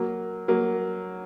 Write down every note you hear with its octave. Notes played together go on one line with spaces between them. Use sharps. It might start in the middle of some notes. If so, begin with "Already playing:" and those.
Already playing: F#3 A#3
F#3 A#3